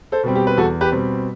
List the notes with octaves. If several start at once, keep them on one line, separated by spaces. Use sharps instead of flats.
A4 C5
B2 G3 C4
G4
B4
E2 F#4 A4
G4 B4
B2 G3 C4